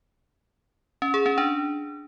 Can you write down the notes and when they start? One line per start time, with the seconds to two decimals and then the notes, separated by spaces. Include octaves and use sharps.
1.02 C#4
1.14 G#4
1.26 C#4
1.38 D4